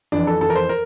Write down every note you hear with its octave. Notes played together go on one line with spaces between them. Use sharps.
F2 E3 D4
A4
F2 E3 A4
A#4
C5
A#4